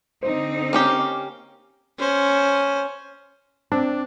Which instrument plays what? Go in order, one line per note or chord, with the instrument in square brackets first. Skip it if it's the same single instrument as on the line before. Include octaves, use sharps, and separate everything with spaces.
[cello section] D3 C4 D#4 [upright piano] C5
[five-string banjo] A#3 C#4 G4
[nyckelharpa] C#4 C5
[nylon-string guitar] C4 [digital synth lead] D4